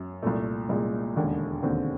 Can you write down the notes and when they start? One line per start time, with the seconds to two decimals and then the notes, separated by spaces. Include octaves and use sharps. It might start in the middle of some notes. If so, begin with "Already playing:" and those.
Already playing: F#2
0.23 C2 A#2 A3
0.69 C2 A#2 G#3
1.16 E1 D#2 D3
1.62 E1 D#2 D3 C4